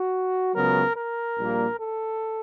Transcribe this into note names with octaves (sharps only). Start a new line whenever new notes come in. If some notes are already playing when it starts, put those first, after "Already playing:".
Already playing: F#4
C#2 C#3 F#3 B3 A#4
A#4
A#1 A#2 G3 A#3
A4